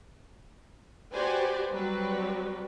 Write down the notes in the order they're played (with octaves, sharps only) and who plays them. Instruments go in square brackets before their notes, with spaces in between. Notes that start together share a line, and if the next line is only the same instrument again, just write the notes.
[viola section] F#4 G4 B4 C5 D5 G#5
F#3 G3 C4 F#4 B4 D5